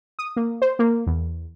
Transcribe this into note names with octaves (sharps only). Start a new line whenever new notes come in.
D#6
A#3
C5
A#3
E2